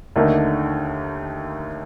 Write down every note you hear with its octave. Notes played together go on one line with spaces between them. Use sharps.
D#2 D3 A3 D#4 A#4